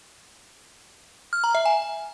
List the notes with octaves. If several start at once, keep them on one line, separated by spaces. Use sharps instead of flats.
F6
A#5
E5
G#5